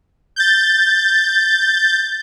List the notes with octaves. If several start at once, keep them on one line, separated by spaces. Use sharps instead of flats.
G6 A6